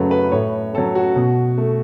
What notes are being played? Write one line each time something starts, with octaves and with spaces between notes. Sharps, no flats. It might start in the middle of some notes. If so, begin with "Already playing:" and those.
Already playing: F#2 C#3 F#3 A3 A4 B4
B4
A2 C#5
F#3 A3 A4
F#4
B2
A3